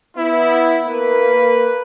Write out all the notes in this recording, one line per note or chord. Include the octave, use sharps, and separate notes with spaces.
B3 E4
A#3 B4